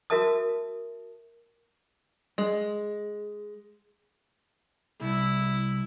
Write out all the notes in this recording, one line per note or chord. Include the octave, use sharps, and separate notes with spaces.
F#4 A#4 E5 A5 D#6
G#3
C2 E4